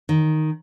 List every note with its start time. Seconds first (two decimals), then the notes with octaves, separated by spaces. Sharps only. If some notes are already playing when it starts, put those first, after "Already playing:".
0.09 D#3